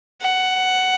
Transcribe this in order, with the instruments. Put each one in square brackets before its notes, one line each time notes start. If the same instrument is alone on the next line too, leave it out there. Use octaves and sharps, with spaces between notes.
[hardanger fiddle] F#5